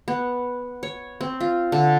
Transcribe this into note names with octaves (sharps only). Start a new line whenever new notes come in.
B3
C#5
C4
F4
D3